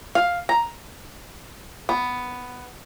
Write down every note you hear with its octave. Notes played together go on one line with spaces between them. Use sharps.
F5
A#5
B3